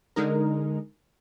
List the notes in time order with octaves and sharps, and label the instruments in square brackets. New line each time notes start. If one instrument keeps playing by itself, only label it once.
[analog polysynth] D3 G#3 D#4 A#4